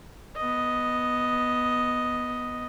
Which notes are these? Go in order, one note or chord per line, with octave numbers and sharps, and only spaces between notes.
B3 D#5